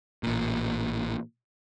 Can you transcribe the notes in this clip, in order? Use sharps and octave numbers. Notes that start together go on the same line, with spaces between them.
A1 A#2